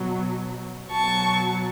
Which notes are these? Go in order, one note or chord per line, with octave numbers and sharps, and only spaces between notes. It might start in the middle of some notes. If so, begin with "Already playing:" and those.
Already playing: B2 F#3
B2 F#3 A5 C#6